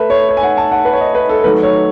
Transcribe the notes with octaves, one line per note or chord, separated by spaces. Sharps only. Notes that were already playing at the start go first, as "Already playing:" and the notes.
Already playing: A3 A4 B4 E5
C#5
C#5
G#5
F#5
A5
F#5
B4
C#5
D#5
B4
A4
D#3 F#3 A3 B4
C#5